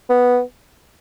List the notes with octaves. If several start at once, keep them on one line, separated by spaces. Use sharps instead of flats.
B3